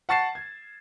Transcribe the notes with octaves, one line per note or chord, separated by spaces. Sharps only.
F#5 A5 C#6 A6 C7 E7
G#6